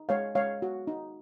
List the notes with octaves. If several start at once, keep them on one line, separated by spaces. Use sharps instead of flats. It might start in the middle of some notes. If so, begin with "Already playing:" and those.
Already playing: D#4
G#3 C#5 F5
G#3 C#5 F5
F#4
D#4